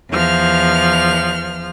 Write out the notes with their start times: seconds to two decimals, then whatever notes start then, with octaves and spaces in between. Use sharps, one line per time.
0.11 E2 F3 F6